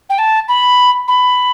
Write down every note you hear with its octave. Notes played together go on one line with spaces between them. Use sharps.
G5
A5
B5
B5